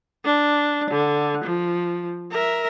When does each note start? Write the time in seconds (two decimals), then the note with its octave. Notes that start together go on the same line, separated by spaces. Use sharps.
0.25 D4
0.91 D3
1.45 F3
2.32 A#4 E5